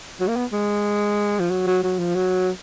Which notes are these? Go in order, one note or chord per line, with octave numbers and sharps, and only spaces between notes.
F#3
A#3
B3
G#3
F3
F#3
F#3
F#3
F3
F#3